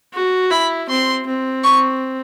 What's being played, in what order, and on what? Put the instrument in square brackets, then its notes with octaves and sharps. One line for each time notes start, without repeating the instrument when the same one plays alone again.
[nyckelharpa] F#4
[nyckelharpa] E4 [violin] B5
[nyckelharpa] C4 [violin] C6
[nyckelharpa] C4
[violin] C#6